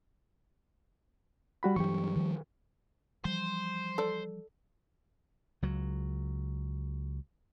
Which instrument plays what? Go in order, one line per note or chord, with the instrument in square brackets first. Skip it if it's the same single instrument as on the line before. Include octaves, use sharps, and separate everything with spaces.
[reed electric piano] G3 F#4 B5
[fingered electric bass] G2 E3 F#3 [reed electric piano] G4 C#6
[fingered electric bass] D#3 F3 G3
[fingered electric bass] E3 F3 G3 [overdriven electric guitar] C5
[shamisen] A4 D5
[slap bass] C#2 F#3